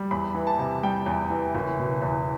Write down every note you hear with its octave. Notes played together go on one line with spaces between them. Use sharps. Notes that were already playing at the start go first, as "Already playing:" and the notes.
Already playing: G3
E2 B5
E3
A5
C3
G3 G5
E2
E3
F#1
B2
E2